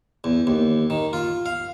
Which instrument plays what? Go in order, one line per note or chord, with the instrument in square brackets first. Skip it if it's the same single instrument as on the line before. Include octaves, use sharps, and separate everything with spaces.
[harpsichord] E2
D#2
D#3
F4
F5